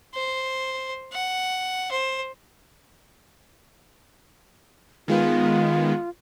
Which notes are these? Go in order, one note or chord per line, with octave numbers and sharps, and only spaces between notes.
C5
F#5
C5
D#3 G#3 B3 F4